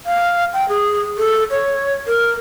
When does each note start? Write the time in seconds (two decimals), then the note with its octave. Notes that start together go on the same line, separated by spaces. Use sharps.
0.06 F5
0.53 G5
0.69 G#4
1.18 A4
1.50 C#5
2.07 A#4